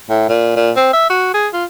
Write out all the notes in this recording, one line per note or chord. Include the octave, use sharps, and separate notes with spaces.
A2
A#2
A#2
C4
E5
F#4
G#4
F4